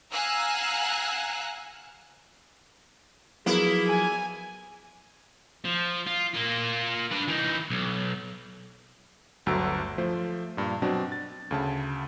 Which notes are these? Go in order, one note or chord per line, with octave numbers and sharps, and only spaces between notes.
F5 F#5 G#5 A#5 E6 F#6
F3 F#3 A#3 B3 E4 G#4
G#5
F3
F4
A#3 F4
D4 B4
E3 D#4
B1
G1 D2 F#3 A#5 E6 D7
F3 A3 C5
G2 A#2
B2 F#3 C4 D4
A6
D2 C#3 A5